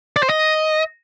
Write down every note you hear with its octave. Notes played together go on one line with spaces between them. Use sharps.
D5
C5
D#5